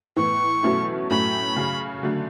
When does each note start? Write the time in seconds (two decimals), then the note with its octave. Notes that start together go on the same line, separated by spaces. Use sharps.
0.16 A2 E3 B3 C#6
0.63 B2 F#3 A3 C#4 E4
1.10 A2 F#3 A3 C#4 B5
1.56 C#3 F#3 C#4
2.03 D3 F#3 A3